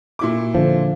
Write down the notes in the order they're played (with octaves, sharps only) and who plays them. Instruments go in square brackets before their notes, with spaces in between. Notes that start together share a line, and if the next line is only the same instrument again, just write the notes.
[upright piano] A#2 E4 D6
[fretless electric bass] D3 F3